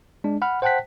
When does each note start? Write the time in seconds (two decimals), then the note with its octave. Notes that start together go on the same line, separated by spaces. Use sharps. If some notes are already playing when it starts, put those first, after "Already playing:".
0.24 G#3 D4
0.42 F#5 B5 F6
0.62 C5 F#5 G5 A5 F#6 B6